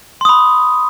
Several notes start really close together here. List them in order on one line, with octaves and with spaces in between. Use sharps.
C6 D#6 B5